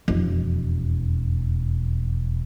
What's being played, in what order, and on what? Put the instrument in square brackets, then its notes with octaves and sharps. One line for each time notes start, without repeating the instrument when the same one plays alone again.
[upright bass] E1 F2